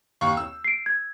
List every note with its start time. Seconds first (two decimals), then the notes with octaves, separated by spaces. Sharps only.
0.21 D#2 F5 C#6
0.37 E6
0.64 C7 D7
0.86 G#6